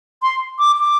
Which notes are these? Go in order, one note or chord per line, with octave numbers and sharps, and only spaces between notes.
C6
D6
D6